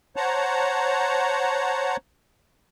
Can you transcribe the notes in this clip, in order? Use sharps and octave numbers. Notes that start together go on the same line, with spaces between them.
C5 C#5 F#5 A5 A#5